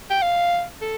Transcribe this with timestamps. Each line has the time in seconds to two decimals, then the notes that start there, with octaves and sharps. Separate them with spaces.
0.10 G5
0.22 F5
0.81 A4